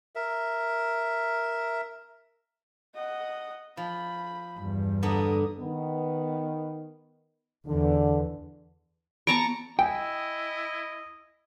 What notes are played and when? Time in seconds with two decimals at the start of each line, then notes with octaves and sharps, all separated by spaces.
0.16 A#4 E5
2.95 D#5 F#5
3.77 F3 B5
4.59 E2 G2
5.03 D3 B3 D4 A#5 D#6
5.60 D#3 B3
7.67 E2 D3
9.27 B3 A5 A#5 C#6
9.79 E4 D#5 G5 G#5